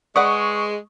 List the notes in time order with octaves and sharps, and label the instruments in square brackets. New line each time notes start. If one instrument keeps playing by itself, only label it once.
[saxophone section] G#3 [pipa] B4 D5 F#5 [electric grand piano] C#6 [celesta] D#6